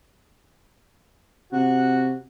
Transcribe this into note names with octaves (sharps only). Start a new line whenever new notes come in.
C3 F#4